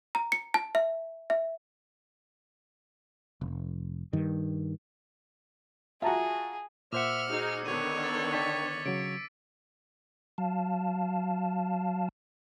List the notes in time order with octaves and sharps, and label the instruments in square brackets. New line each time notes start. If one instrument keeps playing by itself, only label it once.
[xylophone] A#5
C#7
A5
E5
E5
[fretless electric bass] F1
G2 D#3
[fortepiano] F4 F#4 [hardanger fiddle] G#4 [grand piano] E5 A5 A#5
[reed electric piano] A#2 C5 F#5 [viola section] E5 [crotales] D6 E6 C#7 [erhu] F6
[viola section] D#4 F#4 G#4
[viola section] D3 D#3 B3 [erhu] C#5 [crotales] D#7
[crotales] E6 A6
[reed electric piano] D4 G5 C#6 [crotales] A6 B6
[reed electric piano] C#3 F#3 [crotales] D7
[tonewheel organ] F#3 F5 A5